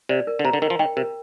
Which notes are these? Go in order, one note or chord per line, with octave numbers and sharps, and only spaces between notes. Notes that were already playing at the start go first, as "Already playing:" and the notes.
C3 D5
A#4
D3
C3 A#5
D3
D#3 A#4
F3
D#3 G5
C3 A#4